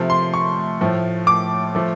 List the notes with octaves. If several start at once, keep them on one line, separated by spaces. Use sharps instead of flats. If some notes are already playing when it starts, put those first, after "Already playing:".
Already playing: C3 F3 A3
C6
C#6
A2 F3 A3
D6
F3 A3